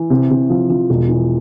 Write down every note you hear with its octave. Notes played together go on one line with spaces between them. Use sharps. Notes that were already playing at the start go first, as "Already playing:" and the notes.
Already playing: E3
C3
C3
F3
F3
E1
E3